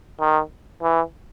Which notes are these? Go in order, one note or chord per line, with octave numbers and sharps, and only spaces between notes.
D#3
E3